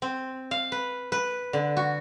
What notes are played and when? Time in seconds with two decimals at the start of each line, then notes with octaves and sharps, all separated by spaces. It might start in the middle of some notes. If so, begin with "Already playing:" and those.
0.02 C4
0.51 F5
0.72 B4
1.12 B4
1.53 D3
1.77 F#4